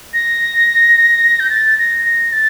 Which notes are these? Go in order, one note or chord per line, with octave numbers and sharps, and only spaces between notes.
A#6
G6
A6
A#6
A#6
A6